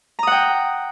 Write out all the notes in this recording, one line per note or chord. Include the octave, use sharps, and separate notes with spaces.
F#5 G5 A#5 D#6